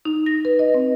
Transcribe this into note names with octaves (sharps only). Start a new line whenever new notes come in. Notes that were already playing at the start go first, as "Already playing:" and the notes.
D#4
A#6
B4
D#5
C4